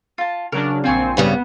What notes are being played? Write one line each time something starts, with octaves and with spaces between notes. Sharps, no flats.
F4 A5
C#3 F#3 D4 A#4
A#1 C4 F4 G#5 C#6
G2 C#3 G3 B3